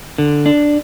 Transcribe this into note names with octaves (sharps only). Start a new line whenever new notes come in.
D3
D4